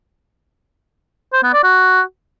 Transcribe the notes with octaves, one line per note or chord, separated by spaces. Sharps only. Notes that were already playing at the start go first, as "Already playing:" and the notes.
C5
B3
D5
F#4